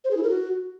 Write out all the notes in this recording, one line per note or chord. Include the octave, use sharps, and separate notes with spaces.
C5
G#4
E4
A#4
F#4